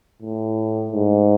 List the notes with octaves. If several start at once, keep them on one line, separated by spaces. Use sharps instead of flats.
A2
G#2